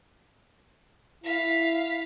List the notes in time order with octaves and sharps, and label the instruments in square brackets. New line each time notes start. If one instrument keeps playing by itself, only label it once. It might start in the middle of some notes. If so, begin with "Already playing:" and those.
[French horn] E4 [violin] F5 B6